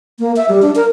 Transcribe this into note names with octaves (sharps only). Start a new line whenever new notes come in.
A#3
E5
G3
D4
A#4